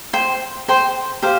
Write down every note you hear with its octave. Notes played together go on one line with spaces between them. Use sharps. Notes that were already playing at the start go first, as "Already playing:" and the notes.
C5 G5 C6
C5 G5 C6
G4 C5 F5